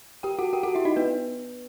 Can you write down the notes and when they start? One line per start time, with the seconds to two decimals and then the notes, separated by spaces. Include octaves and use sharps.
0.23 G4 G5
0.39 F#4 F#5
0.53 G4 G5
0.63 F#4 F#5
0.75 E4 E5
0.85 D#4 D#5
0.96 B3 B4